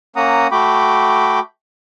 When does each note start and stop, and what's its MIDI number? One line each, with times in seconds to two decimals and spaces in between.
0.16 0.47 58
0.16 0.47 61
0.16 0.47 78
0.16 0.47 82
0.16 0.47 87
0.52 1.40 57
0.52 1.40 66
0.52 1.40 79
0.52 1.40 83
0.52 1.40 86